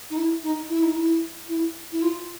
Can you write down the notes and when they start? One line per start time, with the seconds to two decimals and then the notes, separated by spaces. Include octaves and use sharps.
0.10 D#4
0.17 E4
0.43 D#4
0.69 E4
0.82 D#4
0.95 E4
1.48 E4
1.92 E4
2.01 F4